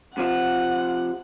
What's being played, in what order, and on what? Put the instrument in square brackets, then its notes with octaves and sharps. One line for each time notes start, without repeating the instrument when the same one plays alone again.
[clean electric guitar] C3 F3 F4 [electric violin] F#5